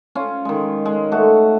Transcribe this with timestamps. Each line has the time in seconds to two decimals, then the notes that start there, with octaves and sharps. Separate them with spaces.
0.15 C#4 F4
0.45 D#3 G#3
0.86 G#3
1.12 A3 F#4